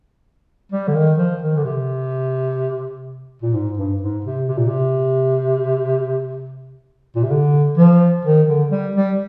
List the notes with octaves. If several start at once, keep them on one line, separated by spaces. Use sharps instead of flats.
G3
D3
D#3
F3
D#3
D3
C3
A#2
G#2
G2
G#2
C3
C3
A#2
C3
A#2
C3
D3
F3
D#3
D3
G3
G3